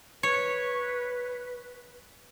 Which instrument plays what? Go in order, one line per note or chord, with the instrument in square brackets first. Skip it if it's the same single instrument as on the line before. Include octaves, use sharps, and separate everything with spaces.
[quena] B4 [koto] C#5